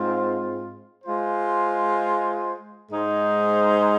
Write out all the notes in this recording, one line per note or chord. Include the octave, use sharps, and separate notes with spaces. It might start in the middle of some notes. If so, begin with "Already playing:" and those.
Already playing: G#2 G#3 C4 F4
G#3 F4 C5
G#2 G#3 D#4 G#4 C5